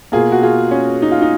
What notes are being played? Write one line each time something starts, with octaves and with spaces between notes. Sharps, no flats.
B2 A#3 F4 G#4
F#4
F4 G#4
C#4
D#4
F4
D#4